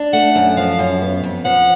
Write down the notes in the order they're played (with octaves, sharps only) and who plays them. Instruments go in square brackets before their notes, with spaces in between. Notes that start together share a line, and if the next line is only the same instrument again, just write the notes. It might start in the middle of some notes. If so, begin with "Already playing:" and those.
Already playing: [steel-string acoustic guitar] D4
[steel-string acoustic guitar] A3 [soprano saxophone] F#5
[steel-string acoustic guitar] F#2
[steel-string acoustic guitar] F3 [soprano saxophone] F5
[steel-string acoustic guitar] F#2
B3
F2
[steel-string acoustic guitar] F3 [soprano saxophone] F#5